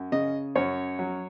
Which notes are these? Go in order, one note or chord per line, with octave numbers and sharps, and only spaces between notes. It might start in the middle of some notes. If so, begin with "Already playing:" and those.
Already playing: F#2
C#3 D#5
F#2 C#5
F#3